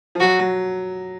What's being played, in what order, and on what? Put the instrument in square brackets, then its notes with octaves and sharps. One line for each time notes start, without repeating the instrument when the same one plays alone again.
[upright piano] F3
[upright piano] F#3 [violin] F#4
[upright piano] F#3